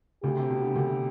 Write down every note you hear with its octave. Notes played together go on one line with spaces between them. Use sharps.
D2 D3 G4
C3
B2
D2 D3
D2 D3